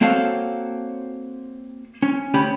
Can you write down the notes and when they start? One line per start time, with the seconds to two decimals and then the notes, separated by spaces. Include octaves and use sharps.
0.01 A#3 C4 F#4 A4 C#5 F5
2.02 C#4
2.34 D2 C#4 G4 B5